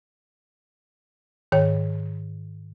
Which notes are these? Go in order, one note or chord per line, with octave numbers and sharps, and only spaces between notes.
G#2 D#3 C#5 G5